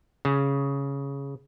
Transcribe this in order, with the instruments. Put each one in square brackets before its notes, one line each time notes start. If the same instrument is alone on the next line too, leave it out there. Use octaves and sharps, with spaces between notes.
[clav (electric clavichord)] C#3